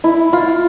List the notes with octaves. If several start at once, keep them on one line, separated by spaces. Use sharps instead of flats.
E4
F4